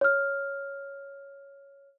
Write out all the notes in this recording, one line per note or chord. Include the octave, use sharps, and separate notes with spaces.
C#5 F6